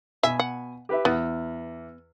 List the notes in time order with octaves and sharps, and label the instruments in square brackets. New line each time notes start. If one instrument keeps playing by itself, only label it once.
[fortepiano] B2 G#5 B5 [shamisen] E5
[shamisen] F#5
[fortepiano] G4 B4 E5
[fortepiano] E2 [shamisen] B3